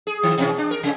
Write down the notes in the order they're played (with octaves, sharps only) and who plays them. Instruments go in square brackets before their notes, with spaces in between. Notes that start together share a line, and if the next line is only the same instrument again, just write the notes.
[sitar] G#4
D#3
B2 E3 C#4
D4
A#4
C3